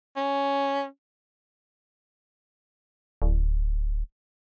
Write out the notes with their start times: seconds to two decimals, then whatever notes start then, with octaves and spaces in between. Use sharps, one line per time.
0.16 C#4
3.22 D1